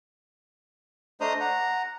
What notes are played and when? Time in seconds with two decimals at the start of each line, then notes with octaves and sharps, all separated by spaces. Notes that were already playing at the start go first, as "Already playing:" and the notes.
1.21 A3 D4 C5 D#5 A#5 D#6
1.40 F#5 A#5